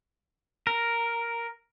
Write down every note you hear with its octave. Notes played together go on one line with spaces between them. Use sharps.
A#4